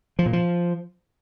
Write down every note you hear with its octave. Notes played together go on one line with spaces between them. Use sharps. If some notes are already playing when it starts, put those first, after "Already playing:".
F3
A#2
F3